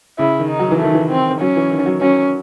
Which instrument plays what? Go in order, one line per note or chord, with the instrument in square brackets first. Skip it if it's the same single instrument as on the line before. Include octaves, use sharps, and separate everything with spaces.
[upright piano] C#3 [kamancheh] E4
[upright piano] D#3
[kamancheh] D#4
[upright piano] F#3
E3
[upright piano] D#3 [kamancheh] A3
[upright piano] E3
[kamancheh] C4
[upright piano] F#3 [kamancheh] C#4
[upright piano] E3
D#3
F#3
[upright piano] F#3 [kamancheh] C#4